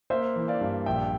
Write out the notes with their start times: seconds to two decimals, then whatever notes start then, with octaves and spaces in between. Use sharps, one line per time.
0.10 A#3 C5 E5
0.36 E3
0.48 D5 F5
0.61 G2
0.86 A#1 E5 G5